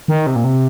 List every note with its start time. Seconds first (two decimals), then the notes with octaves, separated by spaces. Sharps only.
0.08 D#3
0.27 C3
0.36 A#2
0.44 C3